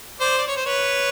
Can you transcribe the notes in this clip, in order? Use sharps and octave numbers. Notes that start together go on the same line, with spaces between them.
C5 D5
D5
C#5
C5
B4 C#5